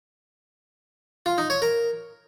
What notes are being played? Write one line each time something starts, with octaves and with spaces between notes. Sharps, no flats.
F4
D#4
C#5
A#4